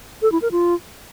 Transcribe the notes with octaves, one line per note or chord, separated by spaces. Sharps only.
A4
E4
A#4
F4